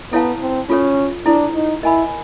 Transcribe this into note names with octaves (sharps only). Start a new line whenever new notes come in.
B3 E4 A4 C#5 F5 A5
C4
C#4 F4 A4 C#5
D4 E4 A4 C5
D#4
E4 A#4 D#5 G#5 B5